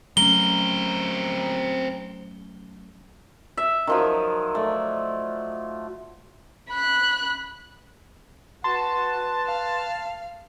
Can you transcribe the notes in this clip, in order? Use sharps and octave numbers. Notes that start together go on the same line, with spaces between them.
F#3 A3 C4 C#4 A#4 G7
E5
D#3 F3 F#3
A3 D5
B5 F#6
F#4 B4 A5 C6
F5